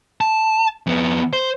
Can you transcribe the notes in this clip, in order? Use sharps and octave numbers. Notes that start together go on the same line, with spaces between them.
A5
F2 B3
C5